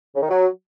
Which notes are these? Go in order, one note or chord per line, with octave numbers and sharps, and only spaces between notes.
C#3
D#3
F#3